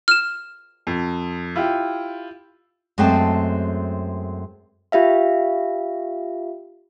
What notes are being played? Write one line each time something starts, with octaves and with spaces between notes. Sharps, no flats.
F6 E7
F2
E4 F4 G4
F#2 G#3 A3 C4 G5 A5
F4 G4 E5 F5